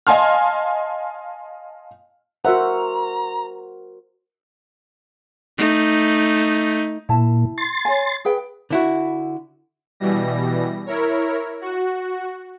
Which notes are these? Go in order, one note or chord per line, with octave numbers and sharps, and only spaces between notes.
D#5 F5 G#5 A5 C6 F6
F#4 A#4 C5 E5 F#5 A#5
A3 D#4
A#2 E4 A5
C6 A6
C#5 G#5
G#4 B4 G5
D3 E4 F#4
B2 E3 G3 A#6
E4 A#4 C#5
F#4